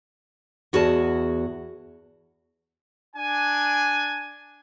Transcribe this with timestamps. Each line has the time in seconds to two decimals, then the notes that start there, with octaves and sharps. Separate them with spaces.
0.73 E2 F#4 G#4 D#5 A5
3.15 D4 G#5